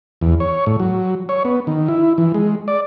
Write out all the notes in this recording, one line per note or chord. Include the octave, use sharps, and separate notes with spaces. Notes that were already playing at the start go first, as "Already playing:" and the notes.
E2
C#5
A2
F#3
C#5
B3
D#3
E4
E3
G#3
D5